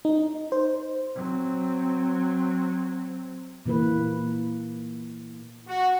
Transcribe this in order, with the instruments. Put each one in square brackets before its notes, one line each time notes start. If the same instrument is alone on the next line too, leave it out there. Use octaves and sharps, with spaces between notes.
[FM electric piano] D#4
C5
[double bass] F#3 C4
[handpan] A#2 E3 A#3 B4
[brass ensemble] F#4